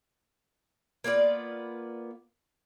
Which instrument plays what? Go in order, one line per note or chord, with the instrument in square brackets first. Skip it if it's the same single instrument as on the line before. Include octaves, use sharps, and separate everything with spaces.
[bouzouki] A#3 B3 F4 D5